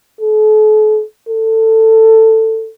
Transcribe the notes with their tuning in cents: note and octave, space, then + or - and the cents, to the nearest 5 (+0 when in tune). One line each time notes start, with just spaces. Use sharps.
A4 -40
A4 +15